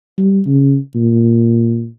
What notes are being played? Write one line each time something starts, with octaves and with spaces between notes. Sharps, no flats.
G3
C#3
A#2